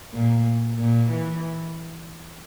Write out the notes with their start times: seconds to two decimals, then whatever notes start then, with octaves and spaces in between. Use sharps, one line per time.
0.14 A#2
0.79 A#2
1.10 E3